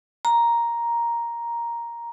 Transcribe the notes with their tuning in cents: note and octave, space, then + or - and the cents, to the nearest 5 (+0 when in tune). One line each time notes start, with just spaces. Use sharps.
A#5 +5